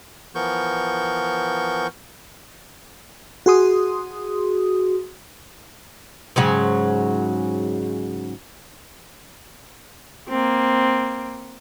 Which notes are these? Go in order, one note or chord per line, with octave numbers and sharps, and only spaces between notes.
E3 F3 B3 A#4 C#6 G6
F#4 G#4 C6 D#6
G#2 C#3 F#3
A#3 C4